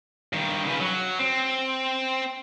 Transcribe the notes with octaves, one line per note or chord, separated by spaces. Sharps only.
G2 D#3
C#3 B4
F#3
C4